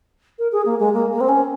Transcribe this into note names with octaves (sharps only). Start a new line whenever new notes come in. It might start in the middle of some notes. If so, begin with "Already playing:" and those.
A#4
G#4
A#3
G#3
A#3
A#3
C4
C#4